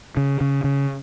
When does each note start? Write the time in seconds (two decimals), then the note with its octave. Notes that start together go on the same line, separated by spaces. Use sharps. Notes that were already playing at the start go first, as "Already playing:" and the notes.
0.17 C#3
0.41 C#3
0.64 C#3